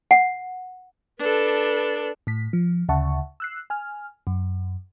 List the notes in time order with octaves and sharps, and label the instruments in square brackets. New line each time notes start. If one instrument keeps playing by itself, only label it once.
[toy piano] F#5
[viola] D4 A4 [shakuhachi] B4
[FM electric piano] A2 B6
F3
D2 C#3 E5 F#5 A5 C#6
E6 F#6 C7
G#5 F6
F#2